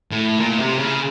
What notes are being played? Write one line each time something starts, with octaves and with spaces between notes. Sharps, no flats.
A2
A#2
C3
C#3